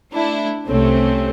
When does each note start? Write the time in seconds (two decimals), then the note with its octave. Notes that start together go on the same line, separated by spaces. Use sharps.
0.11 A3 D4 E4
0.67 C2 C3 A3 C4 C#4